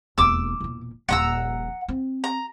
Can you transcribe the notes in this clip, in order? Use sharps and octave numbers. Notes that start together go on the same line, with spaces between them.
E1 D#2 D6 E6
E1 A#2
D#1 A#1 F#5 A#5 E6
C4
A#5